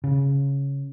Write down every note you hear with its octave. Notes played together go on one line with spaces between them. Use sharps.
C#3